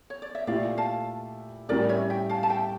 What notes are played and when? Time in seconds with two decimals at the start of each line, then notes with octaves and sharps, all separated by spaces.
0.10 C#5
0.22 D5
0.35 E5
0.47 A#2 A3 E4 G4 D5 F5
0.78 F5 A5
1.69 A2 G3 C#4 G4 A#4 D5
1.89 C#5 E5
2.10 E5 G5
2.29 F5 A5
2.43 A5
2.50 E5 G5